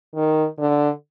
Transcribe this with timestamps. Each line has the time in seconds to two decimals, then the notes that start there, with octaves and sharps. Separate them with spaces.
0.15 D#3
0.59 D3